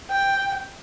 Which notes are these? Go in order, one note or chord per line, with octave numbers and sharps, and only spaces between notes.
G5